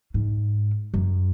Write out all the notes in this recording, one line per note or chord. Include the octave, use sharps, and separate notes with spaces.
G#2
F#2